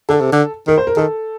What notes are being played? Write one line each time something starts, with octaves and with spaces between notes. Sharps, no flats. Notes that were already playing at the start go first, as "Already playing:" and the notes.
D3 A4
C3
D3
D#3 A#4
C5
A#4
D#3 A4